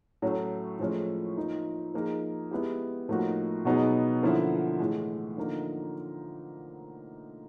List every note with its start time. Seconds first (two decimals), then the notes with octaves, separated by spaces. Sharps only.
0.22 A2 F#3 A3 C#4
0.79 A2 F3 G#3 C#4
1.37 F3 A#3 D#4
1.94 F3 A#3 D#4 G#4
2.51 G#3 B3 E4 G4
3.09 A2 F3 A#3 D#4 F#4
3.65 B2 F#3 B3 D#4 G#4
4.23 D3 F3 A#3 C#4 E4
4.80 A2 E3 G#3
5.37 D3 F3 A#3 D#4